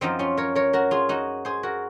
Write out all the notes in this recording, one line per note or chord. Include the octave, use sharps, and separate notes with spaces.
F#2 F3 C4 D#4
C#4 F4
A#4 C#5
A#4 C#5
F#4 A#4
F4 G#4
D#4 F#4
G#4 C5
F#4 A#4